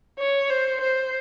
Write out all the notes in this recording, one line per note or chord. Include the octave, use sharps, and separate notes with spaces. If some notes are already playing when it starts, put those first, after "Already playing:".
C#5
C5
C5